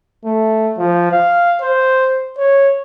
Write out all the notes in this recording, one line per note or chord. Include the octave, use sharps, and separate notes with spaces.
A3
F3
F5
C5
C#5